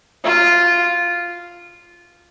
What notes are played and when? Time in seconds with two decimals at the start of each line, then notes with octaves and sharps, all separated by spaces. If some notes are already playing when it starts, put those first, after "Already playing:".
0.24 F4